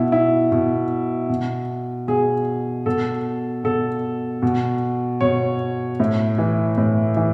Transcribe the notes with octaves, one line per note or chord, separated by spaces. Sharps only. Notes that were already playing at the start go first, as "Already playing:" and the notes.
Already playing: B2 E4
E4
B2
B2
B2 G#4
B2 A4
B2 A4
B2
B2 C#5
A2
E3
A2
E3